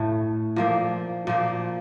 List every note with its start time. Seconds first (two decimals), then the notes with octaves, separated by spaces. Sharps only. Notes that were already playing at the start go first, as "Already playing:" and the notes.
Already playing: A2 A3
0.56 A#2 F3 A#3
1.27 A#2 F3 A#3